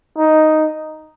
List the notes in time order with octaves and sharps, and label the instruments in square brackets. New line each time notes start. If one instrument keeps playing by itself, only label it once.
[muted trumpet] D#4